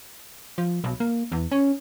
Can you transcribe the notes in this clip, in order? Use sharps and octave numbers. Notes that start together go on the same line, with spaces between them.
F3
B1
A#3
E2
C#4